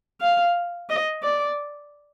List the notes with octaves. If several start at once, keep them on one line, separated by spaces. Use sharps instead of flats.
F5
D#5
D5